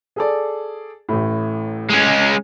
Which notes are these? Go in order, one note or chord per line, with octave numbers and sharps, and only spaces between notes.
G#4 A4 D5
A1 A2
G#3 C#4